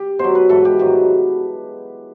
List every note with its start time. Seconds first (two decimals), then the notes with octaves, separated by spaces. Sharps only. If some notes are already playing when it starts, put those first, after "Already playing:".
Already playing: G4
0.19 B2 F#3 C5
0.35 B4
0.49 G#2 E3 A4
0.65 G4
0.79 G#2 D#3 F#3